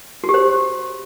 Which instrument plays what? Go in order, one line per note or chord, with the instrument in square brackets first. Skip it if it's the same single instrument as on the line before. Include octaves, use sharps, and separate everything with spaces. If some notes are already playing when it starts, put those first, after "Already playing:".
[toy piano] F#4
G4
C5